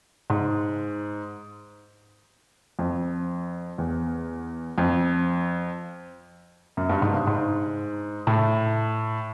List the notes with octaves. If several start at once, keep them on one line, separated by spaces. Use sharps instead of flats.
G#2
F2
E2
F2
F#2
G2
G#2
G2
G#2
A2